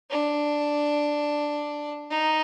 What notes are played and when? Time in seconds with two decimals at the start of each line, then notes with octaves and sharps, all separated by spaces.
0.10 D4
2.10 D#4